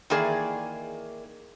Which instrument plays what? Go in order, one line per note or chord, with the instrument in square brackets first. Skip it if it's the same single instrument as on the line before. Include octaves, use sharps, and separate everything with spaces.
[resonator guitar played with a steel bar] D#3 E3 A#3 G#4 D5